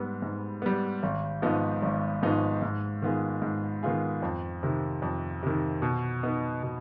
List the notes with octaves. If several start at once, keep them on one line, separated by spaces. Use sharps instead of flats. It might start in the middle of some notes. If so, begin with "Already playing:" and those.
Already playing: G#2 G3 B3
G#2
G3 B3
G#1
G#2 F3 B3 D#4
G#1
G#2 F3 B3 D#4
G#2
D#3 B3 F4 G#4
G#2
D#3 B3 F4 G#4
F2
C3 D#3
F2
C3 D#3
B2
B3 D#4
B2